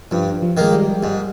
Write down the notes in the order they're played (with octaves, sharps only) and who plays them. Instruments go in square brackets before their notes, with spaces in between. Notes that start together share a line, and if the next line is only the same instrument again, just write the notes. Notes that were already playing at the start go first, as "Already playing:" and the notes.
[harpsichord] G2 [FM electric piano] F3
[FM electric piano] F3
[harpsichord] D#3 A#3 [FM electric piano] G#3
[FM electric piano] G3
[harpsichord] G#2 [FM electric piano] G3